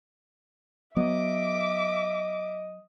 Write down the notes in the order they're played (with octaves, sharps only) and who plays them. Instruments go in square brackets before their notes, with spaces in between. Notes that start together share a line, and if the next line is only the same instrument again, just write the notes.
[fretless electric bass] F#3 B3 [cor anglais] D#5 [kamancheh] E5 D6